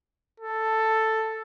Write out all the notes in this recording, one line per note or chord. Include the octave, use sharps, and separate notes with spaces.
A4